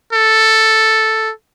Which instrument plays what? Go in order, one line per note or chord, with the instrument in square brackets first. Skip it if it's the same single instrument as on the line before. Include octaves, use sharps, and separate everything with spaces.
[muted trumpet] A4